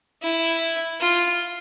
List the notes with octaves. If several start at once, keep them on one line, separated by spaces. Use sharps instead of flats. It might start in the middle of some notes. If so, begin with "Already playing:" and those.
E4
F4